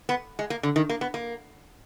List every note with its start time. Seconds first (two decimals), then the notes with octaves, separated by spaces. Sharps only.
0.09 B3
0.39 G#3
0.50 A#3
0.63 D3
0.76 D#3
0.89 A#3
1.01 B3
1.14 A#3